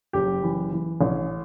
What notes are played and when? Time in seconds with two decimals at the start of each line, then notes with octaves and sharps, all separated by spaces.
0.13 F#1 G4
0.43 E3
0.72 E3
1.01 A1